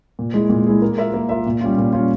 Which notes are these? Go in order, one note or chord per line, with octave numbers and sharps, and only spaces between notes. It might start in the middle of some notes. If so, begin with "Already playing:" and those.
A#2
G#3 E4 G#4
A#2
G#3 E4 G#4
A#3
F4 A#4 E5
A#3
F4 A#4 E5
A#2
G3 C#4 F4
A#2
G3 C#4 F4